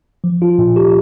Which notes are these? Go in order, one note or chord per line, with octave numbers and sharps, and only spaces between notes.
F3
F4
A#2
G4